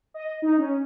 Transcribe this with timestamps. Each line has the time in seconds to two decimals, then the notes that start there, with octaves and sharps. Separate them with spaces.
0.14 D#5
0.42 D#4
0.58 C#4